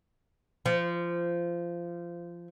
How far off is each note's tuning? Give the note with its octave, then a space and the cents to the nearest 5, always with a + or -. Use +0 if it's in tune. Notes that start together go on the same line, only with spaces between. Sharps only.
F3 -20